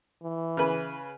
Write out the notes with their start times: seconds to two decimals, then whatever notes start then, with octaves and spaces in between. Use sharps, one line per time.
0.23 E3
0.57 C#3 B4